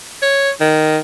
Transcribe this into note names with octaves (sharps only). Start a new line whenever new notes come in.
C#5
D#3